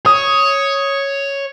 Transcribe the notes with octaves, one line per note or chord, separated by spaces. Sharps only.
C#5 D#6